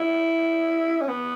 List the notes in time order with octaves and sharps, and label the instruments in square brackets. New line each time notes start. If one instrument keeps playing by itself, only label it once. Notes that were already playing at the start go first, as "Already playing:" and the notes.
Already playing: [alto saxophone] E4
C#4
B3